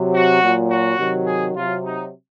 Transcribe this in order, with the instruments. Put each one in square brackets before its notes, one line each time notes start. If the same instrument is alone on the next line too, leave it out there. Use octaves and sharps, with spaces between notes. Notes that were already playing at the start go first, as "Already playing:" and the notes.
Already playing: [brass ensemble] C3 F#3
F#4
A#2 F#3
F#4
C3 D#3 F#3
G#4
C3 F#3 F4
D#4